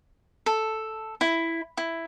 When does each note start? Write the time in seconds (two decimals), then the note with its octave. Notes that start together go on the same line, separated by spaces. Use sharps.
0.46 A4
1.21 E4
1.77 E4